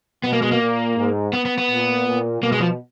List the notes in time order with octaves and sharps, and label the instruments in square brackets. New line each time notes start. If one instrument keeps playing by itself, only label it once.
[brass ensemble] B2 [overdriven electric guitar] B3
[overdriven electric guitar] A#3
G#3
A#3
[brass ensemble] A#2
G#2
[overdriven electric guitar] B3
B3
B3
[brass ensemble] A#2
A#2
[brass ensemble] B2 [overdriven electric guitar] A#3
[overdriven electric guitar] G#3
F3